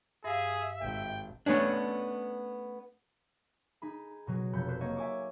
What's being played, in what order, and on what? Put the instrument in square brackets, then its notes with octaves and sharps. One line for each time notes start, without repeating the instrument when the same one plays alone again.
[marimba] G2 F5 [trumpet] G#4 [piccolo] E5
[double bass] G#1 [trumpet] G5
[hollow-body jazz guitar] A3 B3 C#4 D4
[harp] D#4 G#4 B5
B2 F#3 G#4
F1 B5 G6 C#7
B4 C5
A#3 C5 C#5 D#5 F#5
E5 G#5 C#6 D6